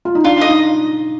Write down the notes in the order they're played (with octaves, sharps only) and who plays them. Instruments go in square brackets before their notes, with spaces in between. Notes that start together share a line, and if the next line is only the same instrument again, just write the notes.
[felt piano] F4
D#4
[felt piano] D4 [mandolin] F4
[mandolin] D#5
[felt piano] D#4